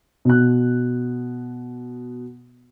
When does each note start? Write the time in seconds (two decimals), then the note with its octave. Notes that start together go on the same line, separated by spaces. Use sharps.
0.25 B2 F#6